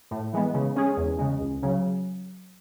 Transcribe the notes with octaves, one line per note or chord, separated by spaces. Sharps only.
A2
E3 G#3 B3
C#3
G#3 C#4 G#4
E2
C#3 G#3
C#2
C#3 F#3